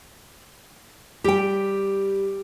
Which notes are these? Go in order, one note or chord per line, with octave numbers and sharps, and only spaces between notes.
G3 G4 G5